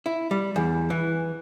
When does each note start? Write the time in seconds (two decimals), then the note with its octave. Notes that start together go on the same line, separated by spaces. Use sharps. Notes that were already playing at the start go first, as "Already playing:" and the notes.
0.06 E4
0.31 G3
0.56 E2
0.90 E3